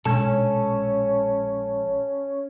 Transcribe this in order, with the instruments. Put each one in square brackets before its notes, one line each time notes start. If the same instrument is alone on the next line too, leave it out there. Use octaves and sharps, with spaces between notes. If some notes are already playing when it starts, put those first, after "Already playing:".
[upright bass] A#1 G#3 [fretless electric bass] B2 D4 [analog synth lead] C#4 [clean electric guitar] A4